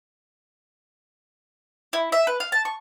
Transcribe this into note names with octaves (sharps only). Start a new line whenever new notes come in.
E4
E5
B4
F5
A5
C#6